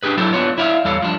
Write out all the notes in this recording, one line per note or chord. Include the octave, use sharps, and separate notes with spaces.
D4 G4 G#4 B4
F#3 E4 A4 C5
B3 D4 F4 C#5
E4 D5 E5 F5
E2 G3 A4 C#5 F5
F3 G3 D4